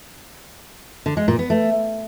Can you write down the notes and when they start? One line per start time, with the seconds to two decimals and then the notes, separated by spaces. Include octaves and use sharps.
1.06 D3
1.17 G#3
1.28 A#2
1.39 B3
1.50 A3